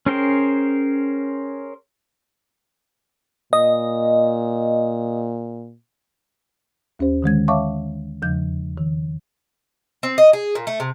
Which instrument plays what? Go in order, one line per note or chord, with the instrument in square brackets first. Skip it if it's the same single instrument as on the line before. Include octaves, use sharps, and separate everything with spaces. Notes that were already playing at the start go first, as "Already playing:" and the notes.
[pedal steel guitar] C#4 G#4 A#4 C5 G5
[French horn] A#2 [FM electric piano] D#5
[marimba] D#2 C#4 G4 C5
D3 D#3 G#3 G#6
C#5 E5 F5 A5 C#6 D6
E2 C#3 F3 G6
D#3
[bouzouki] C4
D#5
G#4
A#2
A3
C3